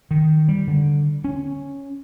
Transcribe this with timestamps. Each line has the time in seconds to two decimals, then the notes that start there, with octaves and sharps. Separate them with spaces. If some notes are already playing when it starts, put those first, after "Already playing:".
0.11 D#3
0.48 G3
0.68 D3
1.24 C#4